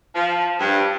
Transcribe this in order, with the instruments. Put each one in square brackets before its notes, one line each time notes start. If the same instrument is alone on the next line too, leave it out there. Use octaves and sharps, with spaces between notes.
[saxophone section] F3
G2